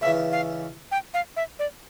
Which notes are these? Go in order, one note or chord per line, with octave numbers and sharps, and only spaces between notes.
C#2 C#3 E3 E5
F5
G5
F5
E5
D5